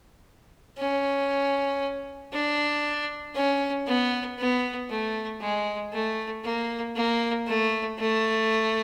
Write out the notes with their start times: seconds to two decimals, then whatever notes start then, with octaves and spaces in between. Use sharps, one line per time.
0.78 C#4
2.32 D4
3.35 C#4
3.87 B3
4.38 B3
4.90 A3
5.41 G#3
5.93 A3
6.44 A#3
6.96 A#3
7.47 A3
7.99 A3